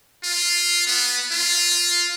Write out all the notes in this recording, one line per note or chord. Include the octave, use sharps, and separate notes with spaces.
F4
B3
F4